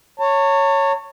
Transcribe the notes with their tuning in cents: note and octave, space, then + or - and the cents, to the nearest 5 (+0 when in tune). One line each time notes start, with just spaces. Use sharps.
C#5 +0 A5 +40